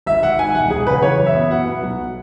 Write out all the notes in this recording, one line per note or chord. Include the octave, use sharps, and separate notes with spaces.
G#1 E5
G#1 F#5
G#2 G#5
E1 F#5
E1 G#4
C#3 B4
E3 C#5
F#2
E5
B3
B2 F#5
B3
B1